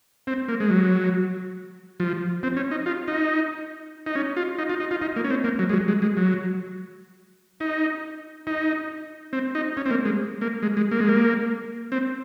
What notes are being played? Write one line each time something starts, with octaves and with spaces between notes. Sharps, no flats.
C4
A#3
G#3
F#3
F3
C4
C#4
D#4
F4
D#4
D#4
C#4
F4
D#4
F4
D#4
F4
D#4
A#3
C#4
C4
A#3
F#3
G#3
F#3
G#3
G#3
F#3
D#4
D#4
C4
D#4
C#4
C4
A#3
G#3
A#3
G#3
G#3
A#3
G#3
A#3
C4